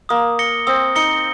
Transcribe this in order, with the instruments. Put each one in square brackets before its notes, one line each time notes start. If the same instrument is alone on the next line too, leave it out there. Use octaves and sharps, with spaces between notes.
[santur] A#3 [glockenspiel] D#6
[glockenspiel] A#6 C#7 G7
[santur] C4 [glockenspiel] D#6
[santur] D#4 [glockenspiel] A#6 C#7 G7